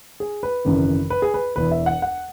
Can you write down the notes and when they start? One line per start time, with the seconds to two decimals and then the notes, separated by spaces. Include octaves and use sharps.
0.20 G#4
0.43 B4
0.65 G#1 F#2 C#3 E3
1.10 B4
1.22 G#4
1.34 B4
1.56 E1 E2 E3 B4
1.71 E5
1.86 F#5
2.02 F#5